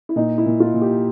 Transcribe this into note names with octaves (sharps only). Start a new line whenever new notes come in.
E4
A#2 D#4
E4
A#2
F4
A#2
G4